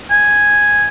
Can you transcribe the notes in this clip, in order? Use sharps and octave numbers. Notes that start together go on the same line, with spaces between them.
G#5